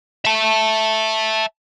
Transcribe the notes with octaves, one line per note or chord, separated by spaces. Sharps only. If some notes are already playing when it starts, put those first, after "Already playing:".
E5 A5